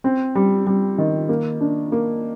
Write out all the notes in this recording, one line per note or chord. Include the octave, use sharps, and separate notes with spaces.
C4
G3
G3
D#3
A#3
D4
A#3